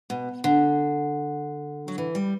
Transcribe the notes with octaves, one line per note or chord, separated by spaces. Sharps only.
B2
D3
F#3
E3
G3